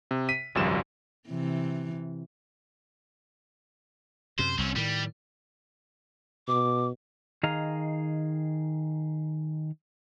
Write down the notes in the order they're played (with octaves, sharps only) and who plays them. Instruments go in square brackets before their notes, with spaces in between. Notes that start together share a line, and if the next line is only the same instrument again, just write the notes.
[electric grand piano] C3
B6 D#7
G#1 C#2 F#2 F3 G3 E7
[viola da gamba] C3 E3
[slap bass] F#2 C3 [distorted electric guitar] C5
[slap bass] C2 [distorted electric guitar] C4 C#4
[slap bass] A2 D#3 [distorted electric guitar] G3
[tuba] B2 [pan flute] D6
[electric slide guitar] D#3 G#4 D#5 F5 A#5